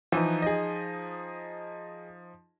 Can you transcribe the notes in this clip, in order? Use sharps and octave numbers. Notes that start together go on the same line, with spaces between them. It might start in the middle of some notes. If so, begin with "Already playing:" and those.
E3 F3 D#4
G#4 D#5